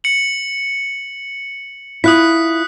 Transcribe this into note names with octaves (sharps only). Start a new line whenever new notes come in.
C#7 F#7
E4 F4 D#6 F#6 B6